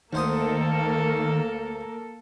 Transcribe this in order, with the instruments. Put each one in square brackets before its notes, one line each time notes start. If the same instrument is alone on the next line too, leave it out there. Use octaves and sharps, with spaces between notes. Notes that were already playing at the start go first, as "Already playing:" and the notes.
[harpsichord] D2 C5 D#6 [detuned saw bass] D#3 [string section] A#3 A#4 [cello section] A4